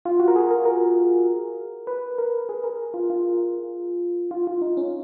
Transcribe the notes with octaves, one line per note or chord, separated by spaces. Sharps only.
F4
F#4
A#4
G#4
A#4
A#4
B4
A#4
G#4
A#4
F4
F4
F4
F4
D#4
C#4